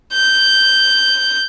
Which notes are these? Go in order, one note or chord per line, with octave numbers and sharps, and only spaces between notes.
G6